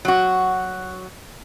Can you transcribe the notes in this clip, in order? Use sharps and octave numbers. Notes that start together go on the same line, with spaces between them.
F#3 F#4